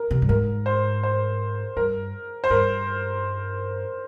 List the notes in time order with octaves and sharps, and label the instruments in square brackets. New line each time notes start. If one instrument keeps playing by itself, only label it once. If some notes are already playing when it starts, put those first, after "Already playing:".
Already playing: [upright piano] A#4
[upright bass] C3
G2
[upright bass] G#2 [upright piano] A#4
[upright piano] C5
C5
[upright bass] G2 [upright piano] A#4
[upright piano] C5
[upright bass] G2 [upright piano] A#4